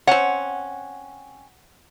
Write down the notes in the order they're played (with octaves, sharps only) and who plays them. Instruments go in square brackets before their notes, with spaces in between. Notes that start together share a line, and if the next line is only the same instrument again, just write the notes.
[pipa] C4 C#4 [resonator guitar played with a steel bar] F#5